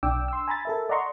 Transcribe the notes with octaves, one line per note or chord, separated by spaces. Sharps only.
B1 D4 G5 D6 E6
C6 E6
G#5 A#5 B5 A6
A4 A#4 E5
D5 D#5 F#5 A#5 C6 C#6